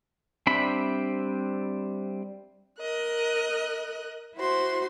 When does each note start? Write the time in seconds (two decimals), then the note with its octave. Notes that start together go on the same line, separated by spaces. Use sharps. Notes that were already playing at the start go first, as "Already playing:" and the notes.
0.47 G3 C4 D4 E5 B5
2.79 A#4 D#5 F#6
4.37 E4 F#4 C5 C6